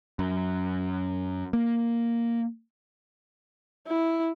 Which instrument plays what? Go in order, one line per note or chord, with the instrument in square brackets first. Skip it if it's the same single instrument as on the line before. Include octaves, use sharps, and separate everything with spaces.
[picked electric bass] F#2
A#3
[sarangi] E4